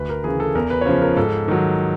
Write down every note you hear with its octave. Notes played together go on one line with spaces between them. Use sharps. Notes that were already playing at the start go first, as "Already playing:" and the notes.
Already playing: D2 B4
A#4
C#3 E3 G#4
A4
E2 A#4
B4
C#5
C#3 F3 C5
A#4
G#2 A4
D#3 F#3